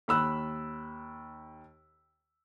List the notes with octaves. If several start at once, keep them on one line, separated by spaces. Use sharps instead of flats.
D#2 B5 E6 F#6